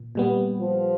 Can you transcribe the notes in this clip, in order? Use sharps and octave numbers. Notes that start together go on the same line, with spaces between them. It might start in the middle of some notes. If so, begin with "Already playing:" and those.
Already playing: A#2
A#2 G3 B3
F3